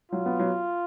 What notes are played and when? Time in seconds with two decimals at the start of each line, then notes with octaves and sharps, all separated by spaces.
0.12 F#3 F4
0.26 B3
0.39 F#3